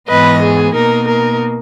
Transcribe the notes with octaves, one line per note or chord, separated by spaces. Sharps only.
G#2 E3 B3 B4 D#5
G#4
B2 A#3 D#4 A#4
A#4